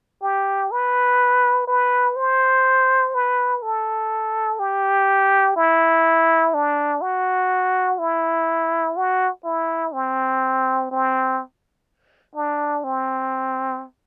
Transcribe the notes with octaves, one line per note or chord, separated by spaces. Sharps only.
G4
B4
B4
C5
B4
A4
G4
E4
D4
F#4
E4
F#4
E4
C4
C4
D4
C4